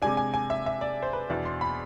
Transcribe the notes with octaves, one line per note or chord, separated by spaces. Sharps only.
C3 G#3 D4 G#5
G#5
G#5
E5
E5
D5
C5
B4
E2 B2 B3 D4 D5
C6
B5